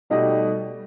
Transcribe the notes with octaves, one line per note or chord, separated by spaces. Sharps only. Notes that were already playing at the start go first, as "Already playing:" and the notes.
B2 G3 A3 D#4 G4 D#5